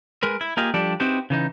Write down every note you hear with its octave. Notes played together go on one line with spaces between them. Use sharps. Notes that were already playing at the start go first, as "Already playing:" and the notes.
G#3 A#4 B4
E4
A#3 F4 G4 G#4 D#5 F5
F3 G3 D4 G4 A4 D5
C4 D#4 E4 F#4 G4 B4
C#3 E3 D#4